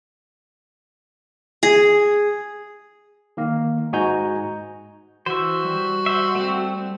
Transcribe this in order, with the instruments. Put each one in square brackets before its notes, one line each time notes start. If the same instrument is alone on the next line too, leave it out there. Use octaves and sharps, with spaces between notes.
[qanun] G#4
[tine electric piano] D#3 A#3
G#2 F#4 D#5 G#5 A#5 G6
[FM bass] E3 [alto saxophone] F#4 [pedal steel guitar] C5 E5
[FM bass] G3
[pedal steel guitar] C5 E5
A3 C4